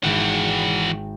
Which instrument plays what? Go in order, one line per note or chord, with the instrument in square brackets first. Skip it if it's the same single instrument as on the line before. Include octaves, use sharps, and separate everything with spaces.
[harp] G#1 G5 [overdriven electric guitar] E3 F#4